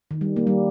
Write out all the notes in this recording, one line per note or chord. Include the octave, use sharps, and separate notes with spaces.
D#3
G3
A#3
G3